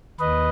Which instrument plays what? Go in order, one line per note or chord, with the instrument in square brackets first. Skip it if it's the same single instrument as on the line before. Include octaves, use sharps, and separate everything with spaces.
[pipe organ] D#2 B4 D#5